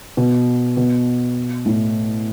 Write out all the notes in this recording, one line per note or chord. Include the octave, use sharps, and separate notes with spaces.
B2
B2
A2